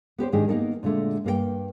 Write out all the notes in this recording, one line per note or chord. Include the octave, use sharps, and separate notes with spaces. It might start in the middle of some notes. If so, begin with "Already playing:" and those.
B3 G4 B4 C5
G#2 D#3 D4 G4 G#4
A#3 B3 D#4 A4 A#4
A#2 D3 G#3 A3
G2 A#3 G#4 G5